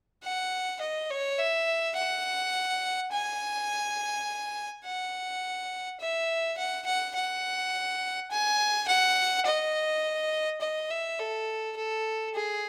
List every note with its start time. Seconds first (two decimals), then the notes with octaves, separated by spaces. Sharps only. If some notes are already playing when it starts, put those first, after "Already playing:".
0.23 F#5
0.81 D#5
1.10 C#5
1.39 E5
1.96 F#5
3.12 G#5
4.85 F#5
6.01 E5
6.58 F#5
6.86 F#5
7.15 F#5
8.31 G#5
8.88 F#5
9.46 D#5
10.61 D#5
10.90 E5
11.19 A4
11.76 A4
12.34 G#4